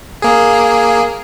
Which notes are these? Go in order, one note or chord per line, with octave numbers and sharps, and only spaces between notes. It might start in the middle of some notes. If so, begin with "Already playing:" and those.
A#3 G#4